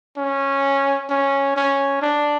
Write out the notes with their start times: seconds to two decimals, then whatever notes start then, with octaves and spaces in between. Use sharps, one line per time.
0.17 C#4
1.10 C#4
1.56 C#4
2.02 D4